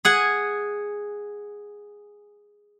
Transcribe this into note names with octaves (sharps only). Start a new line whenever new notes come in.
G#4 F#5 G#5